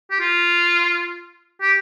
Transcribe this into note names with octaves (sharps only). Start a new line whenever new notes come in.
G4
F4
G4